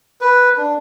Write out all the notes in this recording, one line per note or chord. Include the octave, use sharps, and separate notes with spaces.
B4
D4